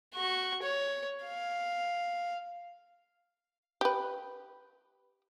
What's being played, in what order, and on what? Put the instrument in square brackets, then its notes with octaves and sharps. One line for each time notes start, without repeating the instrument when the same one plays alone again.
[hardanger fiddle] F#4 C#6
C#5
F5
[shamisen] G4 B4